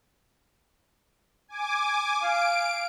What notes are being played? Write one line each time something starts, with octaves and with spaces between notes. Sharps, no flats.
G#5 D6
F5 D7